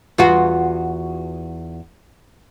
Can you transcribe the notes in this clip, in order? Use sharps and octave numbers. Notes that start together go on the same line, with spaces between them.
E2 F4 F#4